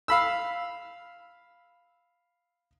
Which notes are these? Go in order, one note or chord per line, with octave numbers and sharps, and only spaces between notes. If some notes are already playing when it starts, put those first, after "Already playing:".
F5 B5 E6